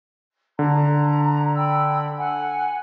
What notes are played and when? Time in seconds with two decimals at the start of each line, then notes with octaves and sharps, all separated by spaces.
0.59 D3 A#5
1.57 G5 B5 E6
2.18 F#5 G#5